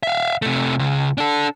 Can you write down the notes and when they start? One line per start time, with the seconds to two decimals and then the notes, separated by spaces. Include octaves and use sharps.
0.03 E5 F5
0.42 C3 A3
0.79 C#2 C#3
1.18 D4 A4